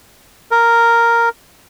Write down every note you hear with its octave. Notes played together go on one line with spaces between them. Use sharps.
A#4